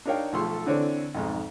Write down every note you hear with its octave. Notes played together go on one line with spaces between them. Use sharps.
D4 D#4 A#4 C#5 F5 G5
B1 F3 A3 A4 C6
D3 E3 C4 D4 C#5
B1 F2 G#2